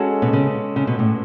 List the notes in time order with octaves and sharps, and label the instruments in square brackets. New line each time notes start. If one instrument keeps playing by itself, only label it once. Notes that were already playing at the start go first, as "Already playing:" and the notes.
Already playing: [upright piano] G#3 C#4 F#4 A4 C#5
[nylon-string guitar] B2
C#3
C#3
B2
A2